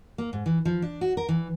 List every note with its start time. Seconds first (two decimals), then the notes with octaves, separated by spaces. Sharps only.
0.18 A#3
0.33 G#2
0.46 E3
0.65 F3
0.82 D4
1.01 F#4
1.17 A#4
1.29 E3